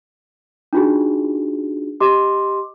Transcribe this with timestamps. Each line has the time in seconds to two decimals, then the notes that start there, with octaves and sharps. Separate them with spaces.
0.73 D4 D#4 F4 F#4 G#4
2.00 G4 D#5 C6 D6